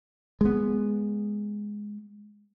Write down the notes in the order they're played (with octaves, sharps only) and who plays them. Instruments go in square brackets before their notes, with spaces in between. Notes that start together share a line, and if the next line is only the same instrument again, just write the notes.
[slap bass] G#3 B3